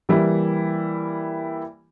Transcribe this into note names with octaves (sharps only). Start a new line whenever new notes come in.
E3 G3 A#3 E4